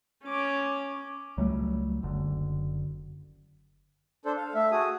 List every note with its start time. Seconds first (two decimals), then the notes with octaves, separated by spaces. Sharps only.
0.24 C#4 D6
1.37 C#2 F#3 G3 A3
2.03 F#1 D3
4.25 D4 A4 C5
4.37 F5
4.55 A3 E5
4.71 F#4 G#4 D#6